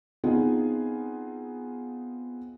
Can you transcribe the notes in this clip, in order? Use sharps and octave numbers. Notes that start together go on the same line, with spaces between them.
B3 C4 D#4 F4 G#4